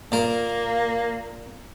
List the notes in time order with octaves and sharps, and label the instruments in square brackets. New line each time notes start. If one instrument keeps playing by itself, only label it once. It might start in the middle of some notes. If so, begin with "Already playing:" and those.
[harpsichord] A#2 A#4 [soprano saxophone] A#3